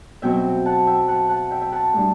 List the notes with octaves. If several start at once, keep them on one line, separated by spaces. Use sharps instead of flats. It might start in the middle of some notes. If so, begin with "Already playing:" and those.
B2 F#3 C4 E5 G5
F#5 A5
E5 G5
F#5 A5
F#5 A5
E5 G5
E5 G5
F#5 A5
A2 G3 D4